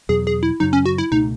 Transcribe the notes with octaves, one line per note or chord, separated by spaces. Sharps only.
E2 B2 F#3 G#4
G#4
E4
F#2 C#3 F#3 D#4
C#4
F#4
E4
C#2 B2 A3 D#4